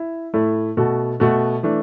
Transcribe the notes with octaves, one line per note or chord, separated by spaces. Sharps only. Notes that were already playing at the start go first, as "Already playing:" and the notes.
Already playing: E4
A2 A3 E4 A4
B2 A3 F#4 A4
B2 A3 F#4 A4
E3 A3 D4